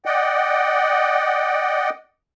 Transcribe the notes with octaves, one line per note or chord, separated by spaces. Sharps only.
D5 D#5 F#5 G5